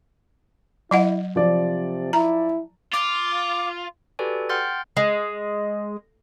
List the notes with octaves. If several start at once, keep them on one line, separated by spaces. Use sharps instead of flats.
F#3 E4 D#5 F#5
C3 F3 D5
E4 A#5
F4 D6
F#4 G4 A4 B4 D5 G#5
F#5 G5 C6 F6 G6 A6
G#3